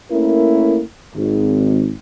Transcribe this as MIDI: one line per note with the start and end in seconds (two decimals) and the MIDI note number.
0.11 0.82 57
0.11 0.82 58
0.11 0.82 61
0.11 0.82 64
0.11 0.82 70
1.16 1.94 32